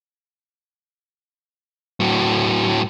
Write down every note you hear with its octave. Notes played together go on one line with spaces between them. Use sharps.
A2 F#3